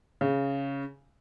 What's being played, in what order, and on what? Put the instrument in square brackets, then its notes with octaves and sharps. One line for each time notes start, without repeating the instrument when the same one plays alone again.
[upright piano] C#3